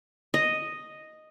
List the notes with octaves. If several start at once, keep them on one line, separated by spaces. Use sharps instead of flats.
D#5